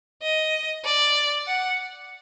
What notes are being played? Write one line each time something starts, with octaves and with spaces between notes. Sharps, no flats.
D#5
D5
F#5